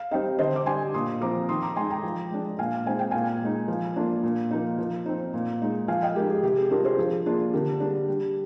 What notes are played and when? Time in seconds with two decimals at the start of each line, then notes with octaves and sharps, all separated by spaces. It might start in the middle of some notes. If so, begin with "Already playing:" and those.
Already playing: F5
0.11 G3 C4 D#4 D#5 G5
0.38 D3 C5 D#5
0.56 D6
0.66 G3 D4 G#5 C6
0.94 A#2 C6 D#6
1.21 F3 C4 F4 A#5 D6
1.49 D#3 C6 D#6
1.62 A#5 D6
1.76 G#3 D#4 G#5 C6
1.90 G5 A#5
2.03 F3
2.31 G#3 D4
2.58 A#2 F5 G#5
2.86 G#3 C4 D#4 G#5
2.99 G5
3.11 A#2 F5 G#5
3.42 G#3 D#4
3.68 F3
3.96 A#3 D4 F4
4.23 A#2
4.51 F3 A#3 D#4
4.78 F3
5.06 C4 D#4
5.33 A#2
5.61 G#3 D#4
5.88 F3 F5 G#5
6.02 D#5 G5
6.16 G#3 D#4 G4 A#4
6.30 G#4
6.43 C3 G4
6.57 G#4
6.70 G3 D4 F4 G4 A#4
6.84 G#4 C5
6.98 F3 G#4
7.26 A#3 D4 F4 G#4
7.53 D3 G4 A#4
7.80 G3 D4 G#4
8.08 G3